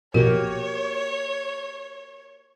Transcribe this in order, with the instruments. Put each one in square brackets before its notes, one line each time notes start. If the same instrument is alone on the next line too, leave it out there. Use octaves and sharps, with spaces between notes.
[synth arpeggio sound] A#1 B2 [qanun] A#3 F#4 G4 [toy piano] A#4 [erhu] C#5